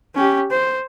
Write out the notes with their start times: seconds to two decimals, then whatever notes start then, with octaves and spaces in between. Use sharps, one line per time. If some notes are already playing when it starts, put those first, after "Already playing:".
0.15 C#4 G4
0.51 C5